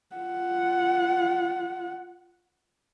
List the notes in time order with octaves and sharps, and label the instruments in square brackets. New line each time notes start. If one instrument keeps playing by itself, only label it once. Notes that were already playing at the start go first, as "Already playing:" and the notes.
[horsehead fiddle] F4 F#5